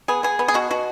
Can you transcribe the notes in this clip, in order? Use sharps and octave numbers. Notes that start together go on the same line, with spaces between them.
B3 G#4
B3 G#4
B3
G#4
B2 F#4
B2 F#4